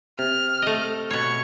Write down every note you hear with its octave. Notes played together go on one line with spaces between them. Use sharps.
C3 F6
A3 D#5
B2 C#5 C#6